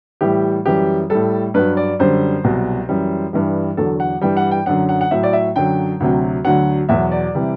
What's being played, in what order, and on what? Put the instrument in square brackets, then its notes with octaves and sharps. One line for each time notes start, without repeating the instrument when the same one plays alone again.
[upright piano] A2 E3 G3 G4
F#2 E3 G3 G4
A2 G3 A4
G2 F#3 B4
D5
F#2 D3 G3 C5
C2 B2 F#3
F#2 E3 G3
G2 E3 G3
E2 D3 F#3 A4
F#5
G2 E3 G3 G5
F#5
G5
F#2 D3 F#3 F#5
F#5
F#5
A2 F#3 E5
D5
E5
F#2 D3 F#3 G5
D2 C3 F#3
D2 D3 F#3 F#5
E2 B2 F#3 E5
D5
C3 E3 G3